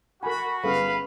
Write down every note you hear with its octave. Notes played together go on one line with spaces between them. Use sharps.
F#4 A#4 G#5 B5
G1 C#3 G#4 B4 F5